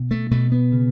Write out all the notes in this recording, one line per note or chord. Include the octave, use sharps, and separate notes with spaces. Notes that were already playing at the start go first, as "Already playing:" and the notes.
Already playing: B2
A3
B2 A3
B3
C#3